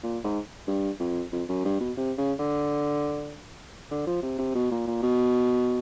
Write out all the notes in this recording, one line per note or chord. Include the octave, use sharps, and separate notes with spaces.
A#2
G#2
G2
F2
F2
F#2
G2
B2
C3
C#3
D3
D3
F3
C3
C3
B2
A#2
A#2
B2